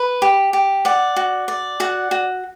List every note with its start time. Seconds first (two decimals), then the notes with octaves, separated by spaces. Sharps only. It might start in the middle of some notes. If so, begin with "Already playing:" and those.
Already playing: B4
0.22 G4
0.53 G4
0.85 D5 F#5
1.16 F#4
1.48 D5
1.80 F#4 F#5
2.11 F#4